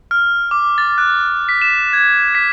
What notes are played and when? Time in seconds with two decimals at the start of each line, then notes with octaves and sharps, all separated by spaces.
0.11 F6
0.51 D6
0.78 A6
0.98 F#6
1.49 B6
1.62 E7
1.93 G#6
2.35 B6